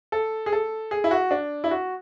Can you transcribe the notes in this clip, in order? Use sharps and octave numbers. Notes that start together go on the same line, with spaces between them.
A4
G#4
A4
G#4
E4
F#4
D4
E4
F#4